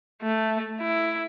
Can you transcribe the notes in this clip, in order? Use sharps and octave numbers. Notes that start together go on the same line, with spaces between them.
A3
E4